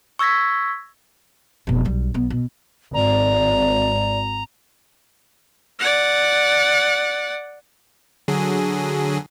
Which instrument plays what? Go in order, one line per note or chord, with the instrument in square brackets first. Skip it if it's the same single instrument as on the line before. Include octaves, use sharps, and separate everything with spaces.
[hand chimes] C#6 E6 G#6 A#6 B6
[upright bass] F1 B2
B1 G3
B1 B3
B2
[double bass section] G#1 [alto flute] D5 [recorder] A#5
[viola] D5 F#5
[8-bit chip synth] D3 F#3 G#4